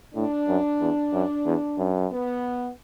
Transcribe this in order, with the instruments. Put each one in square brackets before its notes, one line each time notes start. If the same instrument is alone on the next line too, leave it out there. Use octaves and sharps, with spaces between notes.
[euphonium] A2 [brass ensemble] D4
[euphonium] F#2
E2
F#2
E2
F#2
[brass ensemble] B3